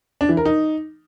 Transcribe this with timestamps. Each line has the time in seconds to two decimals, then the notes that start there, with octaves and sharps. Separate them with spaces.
0.21 D4
0.29 E3
0.37 A#4
0.46 D#4